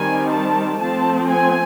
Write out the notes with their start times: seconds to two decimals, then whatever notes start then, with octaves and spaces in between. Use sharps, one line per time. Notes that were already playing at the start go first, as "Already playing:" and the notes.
Already playing: D#3 G3 C4 G#5
0.32 A5
0.81 F3 A3 C4 A5
1.30 G#5